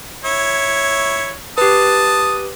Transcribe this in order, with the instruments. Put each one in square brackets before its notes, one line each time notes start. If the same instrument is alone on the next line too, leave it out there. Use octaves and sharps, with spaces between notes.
[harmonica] E4 C#5
[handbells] G4 B4 [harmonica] A5 D#6